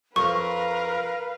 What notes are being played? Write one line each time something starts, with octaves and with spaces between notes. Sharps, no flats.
F2 A#4 B4 F5 C#6